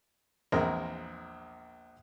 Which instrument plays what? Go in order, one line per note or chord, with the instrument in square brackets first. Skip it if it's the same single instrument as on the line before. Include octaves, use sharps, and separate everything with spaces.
[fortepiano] A#1 E2 G#3 C4 A#4 A#5